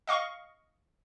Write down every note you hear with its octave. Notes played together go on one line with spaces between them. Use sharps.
D#5 F5 C#6